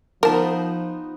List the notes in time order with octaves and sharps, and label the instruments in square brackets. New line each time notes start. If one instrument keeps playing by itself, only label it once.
[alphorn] F3 [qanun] B3 D#4 C5 [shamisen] A#4 A5